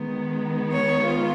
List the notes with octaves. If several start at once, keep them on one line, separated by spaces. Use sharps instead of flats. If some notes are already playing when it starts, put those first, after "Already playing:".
Already playing: D#3 G#3 B3
C#5
F4